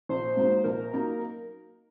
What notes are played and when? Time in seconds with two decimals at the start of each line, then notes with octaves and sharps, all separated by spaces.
0.09 A#1 C5
0.37 G#2 F#3 A#3 D#4
0.64 A#1 A#4
0.93 F#3 A#3 D#4